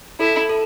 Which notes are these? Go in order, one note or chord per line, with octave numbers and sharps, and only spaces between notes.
E4 A4
A4